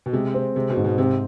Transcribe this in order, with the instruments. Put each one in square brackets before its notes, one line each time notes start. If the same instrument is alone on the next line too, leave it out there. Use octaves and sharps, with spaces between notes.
[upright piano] B2
[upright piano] C3 [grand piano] G#3
[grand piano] C4
[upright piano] C3 [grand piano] G#3
[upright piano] B2
[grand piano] G#2
[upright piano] B2
[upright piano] C3 [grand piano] C4